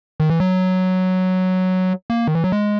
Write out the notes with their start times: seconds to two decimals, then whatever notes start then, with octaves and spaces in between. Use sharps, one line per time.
0.20 D#3
0.29 E3
0.40 F#3
2.10 A#3
2.27 D#3
2.35 E3
2.44 F#3
2.52 G#3